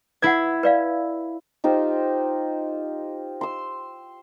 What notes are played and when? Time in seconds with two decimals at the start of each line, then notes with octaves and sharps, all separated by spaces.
0.22 E4 B4 F#5 G#6
0.63 B4 D5 F5
1.64 D#4 F4 G4 C5
3.41 C6 E6